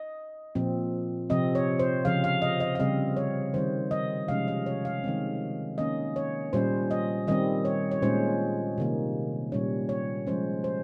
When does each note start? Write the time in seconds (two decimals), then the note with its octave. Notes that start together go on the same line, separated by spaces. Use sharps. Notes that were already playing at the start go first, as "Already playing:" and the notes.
Already playing: D#5
0.55 A#2 F3 C4
1.30 C3 F3 C4 D#5
1.55 C#5
1.79 C5
2.05 C#3 F3 C4 F5
2.24 F5
2.42 D#5
2.60 D#5
2.75 F5
2.80 C#3 G3 C4 D#5
3.17 C#5
3.54 D#3 G3 C4 C5
3.91 D#5
4.28 C3 F3 G#3 C#4 F5
4.48 D#5
4.66 C#5
4.85 F5
5.04 D#3 G#3 C4
5.78 D#3 A#3 C#4 D#5
6.16 C#5
6.53 A#2 G3 C#4 C5
6.91 D#5
7.27 D#3 G3 C4 D#5
7.65 C#5
7.91 C#5
8.02 A#2 G#3 C#4 C5
8.78 C3 D#3 A#3
9.52 A#2 G3 C#4 C#5
9.89 C#5
10.27 F3 G#3 C#4 C5
10.64 C5